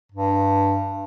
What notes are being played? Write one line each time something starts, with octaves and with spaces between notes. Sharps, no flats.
G2